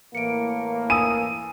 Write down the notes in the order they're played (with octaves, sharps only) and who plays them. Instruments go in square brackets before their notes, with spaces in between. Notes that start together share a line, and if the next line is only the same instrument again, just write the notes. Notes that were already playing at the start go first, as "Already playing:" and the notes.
[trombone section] A2 E3 A#3 [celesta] C#7 D7
[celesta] G#5 D#6 E6 [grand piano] D#7